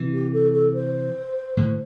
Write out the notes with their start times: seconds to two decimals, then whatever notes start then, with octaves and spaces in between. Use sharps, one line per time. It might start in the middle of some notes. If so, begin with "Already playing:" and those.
Already playing: C3 E3
0.12 G4
0.33 A4
0.53 A4
0.74 C5
1.57 A2 D3